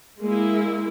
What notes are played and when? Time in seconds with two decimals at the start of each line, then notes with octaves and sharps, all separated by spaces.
0.24 G#3 A#3 E4